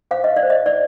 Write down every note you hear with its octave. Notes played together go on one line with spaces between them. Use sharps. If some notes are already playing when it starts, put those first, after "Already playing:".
C5 F5
D#5
D5
C5
D#5
D5